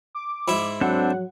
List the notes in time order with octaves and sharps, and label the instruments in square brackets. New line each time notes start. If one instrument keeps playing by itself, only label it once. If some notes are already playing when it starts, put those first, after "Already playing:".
[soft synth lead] D6
[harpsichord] G#2 E4 E5
[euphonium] F#3 [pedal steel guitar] C4 D4 A4 [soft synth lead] F#5